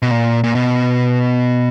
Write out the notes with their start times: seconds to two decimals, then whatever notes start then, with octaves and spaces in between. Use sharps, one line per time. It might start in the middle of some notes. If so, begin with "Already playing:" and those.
0.02 B2
0.11 A#2
0.44 A#2
0.55 B2